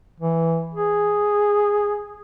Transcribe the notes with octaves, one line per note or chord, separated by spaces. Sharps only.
E3
G#4